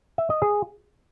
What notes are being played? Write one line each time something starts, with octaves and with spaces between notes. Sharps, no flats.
E5
D#5
G#4